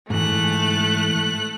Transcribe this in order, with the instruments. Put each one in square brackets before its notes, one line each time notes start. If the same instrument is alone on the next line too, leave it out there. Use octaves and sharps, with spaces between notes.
[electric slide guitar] G#2 E3 [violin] A3 F#6